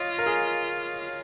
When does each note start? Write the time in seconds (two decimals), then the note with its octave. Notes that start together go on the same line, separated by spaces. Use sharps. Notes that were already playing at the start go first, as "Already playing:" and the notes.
Already playing: F4 C#5 D#5
0.19 A#4
0.26 G#4